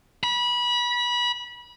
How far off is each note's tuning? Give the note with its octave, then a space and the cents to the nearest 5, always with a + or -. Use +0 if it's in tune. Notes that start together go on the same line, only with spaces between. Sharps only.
B5 -25